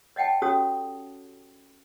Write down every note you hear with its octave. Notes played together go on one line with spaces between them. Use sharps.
C#5 D#5 F#5 G5 A5
C#4 F#4 G4 A4 C#5 D#6